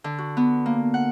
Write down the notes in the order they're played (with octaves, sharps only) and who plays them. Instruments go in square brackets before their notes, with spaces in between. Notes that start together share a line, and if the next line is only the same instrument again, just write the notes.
[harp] D3
F#4
B3
A#3
F#5